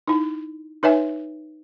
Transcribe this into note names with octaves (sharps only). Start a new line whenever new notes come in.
D#4 E4
D#4 B4 C#5 E5 G#5